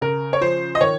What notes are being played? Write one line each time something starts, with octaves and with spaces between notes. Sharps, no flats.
C#3 A#4
C#5
F3 C5
D#5
D#3 C#5